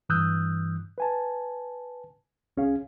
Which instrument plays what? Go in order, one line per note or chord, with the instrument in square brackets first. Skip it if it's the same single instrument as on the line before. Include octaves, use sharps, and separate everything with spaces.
[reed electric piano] G2 E3 D#6 E6 F#6 G6
B4 G#5 A5
C2 C#4 G#4 F5